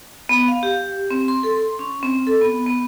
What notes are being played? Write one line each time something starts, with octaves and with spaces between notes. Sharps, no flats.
B3
F5
G4
C4
C6
A4
C6
C#4
C4
A4
B3
B3